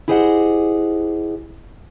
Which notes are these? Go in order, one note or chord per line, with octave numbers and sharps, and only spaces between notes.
E4 G4 G#4 C5 D#5 F#5